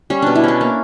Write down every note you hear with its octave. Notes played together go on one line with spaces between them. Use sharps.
G3 C#4
B2 D4
E4
C#4 D4
A#3